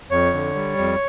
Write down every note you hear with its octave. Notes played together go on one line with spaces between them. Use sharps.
F2 C#5
D3
G3
F2